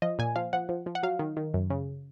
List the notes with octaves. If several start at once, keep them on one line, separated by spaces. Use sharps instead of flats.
F3 D#5
A#2 G#5
F3 F5
F3 F#5
F3
F3
F#5
F#3 F5
D#3
D#3
F#2
C#3